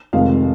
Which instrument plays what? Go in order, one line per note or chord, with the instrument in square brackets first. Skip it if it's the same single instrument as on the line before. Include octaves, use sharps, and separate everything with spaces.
[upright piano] F1 F2 D#3 G#3 F5